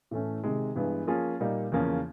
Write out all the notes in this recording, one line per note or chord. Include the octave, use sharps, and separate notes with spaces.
A2 E3 A3 C#4
C3 D#3 G#3
G2 E3 G#3 B3
F3 A#3 C#4 F4 G#4
A#2 G3 A#3 D#4
E2 C#3 F3 A#3 C#4